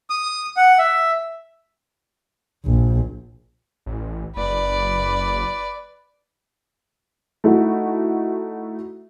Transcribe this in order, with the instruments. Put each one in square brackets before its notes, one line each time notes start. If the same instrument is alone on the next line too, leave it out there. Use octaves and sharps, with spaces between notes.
[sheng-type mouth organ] D#6
F#5
E5
[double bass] A#1
[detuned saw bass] A1
[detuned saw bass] F#1 [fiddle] B4 D5
[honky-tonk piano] A3 D#4 E4 F#4